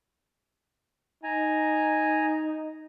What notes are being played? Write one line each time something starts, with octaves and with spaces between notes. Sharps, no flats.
D#4 G#5 A#5